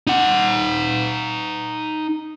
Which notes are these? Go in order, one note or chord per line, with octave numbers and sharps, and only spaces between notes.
D#4 F#5